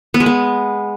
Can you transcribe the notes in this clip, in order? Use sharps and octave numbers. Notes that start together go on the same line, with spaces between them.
B3
G#3
B3